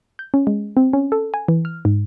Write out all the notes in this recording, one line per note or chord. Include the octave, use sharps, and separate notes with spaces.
G6
C#4
G#3
C4
C#4
A4
G#5
E3
F6
G#2